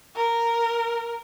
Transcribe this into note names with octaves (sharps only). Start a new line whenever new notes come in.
A#4